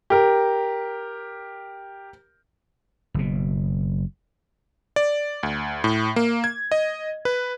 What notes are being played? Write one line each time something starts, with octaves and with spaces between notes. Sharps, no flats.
G4 A#4
F#1 B2
D5
D2
A2
A#3
G#6
D#5
B4